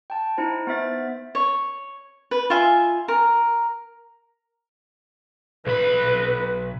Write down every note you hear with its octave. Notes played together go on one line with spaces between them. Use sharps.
G5 A5
D#4 E4 C5
B3 C5 E5 A6
C#5
B4
F4 E5 G#5
A#4
B1 B4 B5